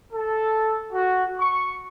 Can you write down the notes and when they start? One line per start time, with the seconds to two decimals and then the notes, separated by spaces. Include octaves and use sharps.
0.13 A4
0.93 F#4
1.39 C#6